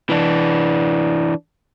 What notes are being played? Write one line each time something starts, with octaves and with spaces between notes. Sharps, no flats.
E3 D4